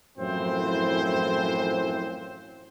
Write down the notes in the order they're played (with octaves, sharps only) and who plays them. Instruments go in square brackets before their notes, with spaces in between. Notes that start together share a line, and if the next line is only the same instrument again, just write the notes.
[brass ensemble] F#2 A2 E3 F3 C4 C5